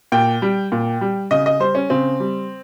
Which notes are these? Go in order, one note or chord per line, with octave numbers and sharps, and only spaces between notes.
A#2 G5
G3
A#2
G3
C#3 D#5
D#5
G3 C5
C#4
C#3 C4
G3